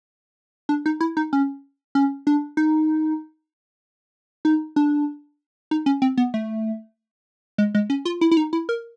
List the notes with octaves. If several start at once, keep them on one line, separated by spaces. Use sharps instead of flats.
D4
D#4
E4
D#4
C#4
C#4
D4
D#4
D#4
D4
D#4
C#4
C4
B3
A3
G#3
G#3
C#4
F4
E4
E4
D#4
E4
A#4